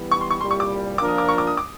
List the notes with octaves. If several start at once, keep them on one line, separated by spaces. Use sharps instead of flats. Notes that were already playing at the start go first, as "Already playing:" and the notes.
Already playing: E3 G3 B3
C#6
C6
C#6
C2 A#2 G3 C6
C#6
D6
F3 A#3 D4 F4 A#4 D6
D#6
D6
C#6
D6
D#6
D6